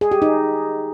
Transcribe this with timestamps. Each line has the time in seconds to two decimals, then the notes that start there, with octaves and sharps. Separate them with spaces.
0.01 G#4
0.11 G4
0.22 D#4